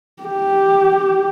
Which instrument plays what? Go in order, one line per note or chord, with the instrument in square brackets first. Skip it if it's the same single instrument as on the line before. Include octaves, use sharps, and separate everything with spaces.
[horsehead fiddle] G4